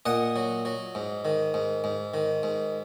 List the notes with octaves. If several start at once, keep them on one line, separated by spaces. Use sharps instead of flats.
A#2 D#5 F#5
F#3
F#3
G#2
D#3
G#2
G#2
D#3
G#2